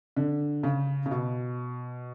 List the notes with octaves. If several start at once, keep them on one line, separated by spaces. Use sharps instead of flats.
D3
C#3
C#3
B2